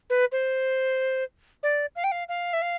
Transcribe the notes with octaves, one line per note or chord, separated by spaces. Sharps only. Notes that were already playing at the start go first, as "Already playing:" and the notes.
B4
C5
D5
F5
G5
F5
F5
E5
F5